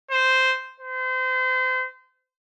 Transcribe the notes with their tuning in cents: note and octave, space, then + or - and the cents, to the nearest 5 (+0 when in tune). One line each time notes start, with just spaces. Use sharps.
C5 -5
C5 -30